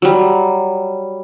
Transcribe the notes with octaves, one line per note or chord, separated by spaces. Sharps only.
F#3 G3